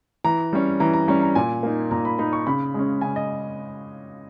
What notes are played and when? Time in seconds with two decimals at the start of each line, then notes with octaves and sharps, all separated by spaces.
0.24 E3 A#5
0.53 G3 C#4
0.80 E3 A#5
0.94 A#5
1.08 G3 C#4 A#5
1.22 A#5
1.35 A#2 G#5
1.63 A#3 D#4
1.91 A#2 A#5
2.05 B5
2.18 A#3 D#4 B5
2.33 C#6
2.47 C#3 B5
2.74 G#3 C#4
3.01 C#3 G#5
3.16 D#5